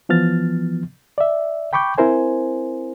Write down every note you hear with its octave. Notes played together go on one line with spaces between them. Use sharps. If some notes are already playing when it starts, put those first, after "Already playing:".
E3 F3 B3 F6 A6
D5 E5
G5 B5 C#6 D6 G6
C4 E4 A#4 C5 G#5